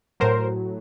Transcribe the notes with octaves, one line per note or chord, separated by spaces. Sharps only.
A2 F#3 A#4 C5